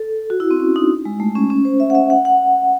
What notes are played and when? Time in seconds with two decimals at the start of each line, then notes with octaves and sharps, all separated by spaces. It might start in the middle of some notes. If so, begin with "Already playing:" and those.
Already playing: A4
0.30 F#4
0.40 E4
0.51 C4
0.60 C#4
0.76 D#4
1.05 G#3
1.20 A3
1.36 C#4
1.50 C#4
1.65 C5
1.80 E5
1.90 F#5
1.95 E5
2.10 F#5
2.25 F#5